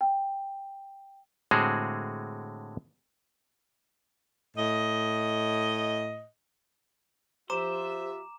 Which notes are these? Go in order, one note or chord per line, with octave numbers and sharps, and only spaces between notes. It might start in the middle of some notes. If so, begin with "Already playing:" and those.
G5
A2 D3 G#3 C4 F#4 G#4
A2 D#5
F3 F4 G4 C5 E5 A#5 D6 E7